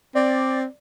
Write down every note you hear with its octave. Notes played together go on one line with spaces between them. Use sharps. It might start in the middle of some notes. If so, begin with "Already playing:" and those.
C4 D5